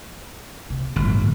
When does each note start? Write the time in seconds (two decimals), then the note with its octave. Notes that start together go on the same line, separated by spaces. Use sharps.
0.70 C3
0.96 G1 A2 F3